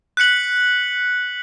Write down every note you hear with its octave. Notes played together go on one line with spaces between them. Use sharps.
F#6 B6 C#7 F#7